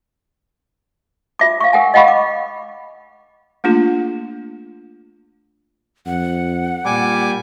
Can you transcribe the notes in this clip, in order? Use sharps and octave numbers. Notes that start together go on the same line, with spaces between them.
F4 E5 D6
F5 C#6
A#4 F#5 G#5
D#5 F5 F#5 B5 C#6
D6
A3 A#3 D4 F4 G#4
F2 F#5
A#2 G3 G#5 D6